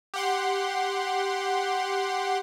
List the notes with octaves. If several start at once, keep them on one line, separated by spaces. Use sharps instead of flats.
G4 F#5 C6